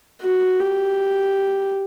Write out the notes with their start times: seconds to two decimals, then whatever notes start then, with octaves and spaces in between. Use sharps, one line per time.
0.22 F#4
0.60 G4